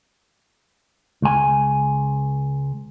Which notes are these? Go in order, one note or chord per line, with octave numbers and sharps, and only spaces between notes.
C#2 G#5